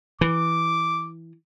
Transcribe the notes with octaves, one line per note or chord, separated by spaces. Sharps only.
E3 D6